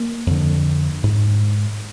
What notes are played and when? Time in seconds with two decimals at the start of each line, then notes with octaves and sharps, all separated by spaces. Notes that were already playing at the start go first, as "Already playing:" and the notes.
Already playing: A#3
0.27 F2 D3
1.03 G#2